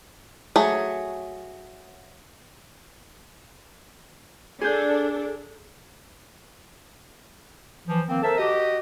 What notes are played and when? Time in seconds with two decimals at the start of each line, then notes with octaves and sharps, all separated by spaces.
0.56 F#3 A3 G#4 C#5
4.61 D4 G#4 A4 G6
7.87 E3 F3
8.08 D#3 F3 A#3 C4
8.22 A4 A#4 C5 E5 A5
8.38 F#4 G4 D#5